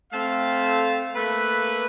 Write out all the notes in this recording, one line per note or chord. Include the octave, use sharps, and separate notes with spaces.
A3 C4 A4 F5
A3 A#3 B4